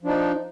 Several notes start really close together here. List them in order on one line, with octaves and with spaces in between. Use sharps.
F3 D4 D#4